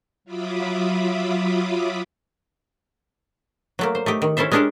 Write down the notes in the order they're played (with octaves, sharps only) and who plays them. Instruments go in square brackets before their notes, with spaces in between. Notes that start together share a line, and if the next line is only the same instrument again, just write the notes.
[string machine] F#3 F4 E5 B5 D6 D#6
[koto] F#3 A3 A#3
C5
A3 D#4 G4
D#3
C#4 E4 A4 C5 E5
G#3 C#4 D4 G4 A4 A#4